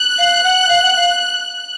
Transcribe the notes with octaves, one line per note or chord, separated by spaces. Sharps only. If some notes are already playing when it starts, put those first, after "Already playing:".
Already playing: F#6
F5
F#5
F5
F#5
F5